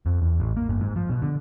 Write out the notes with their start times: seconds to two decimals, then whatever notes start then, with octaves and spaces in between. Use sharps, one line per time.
0.06 F2
0.22 E2
0.40 A1
0.57 A#3
0.69 G1
0.81 G#2
0.96 F3
1.09 B2
1.22 D3